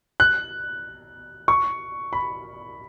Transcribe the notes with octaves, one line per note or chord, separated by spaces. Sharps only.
F#6
C#6
B5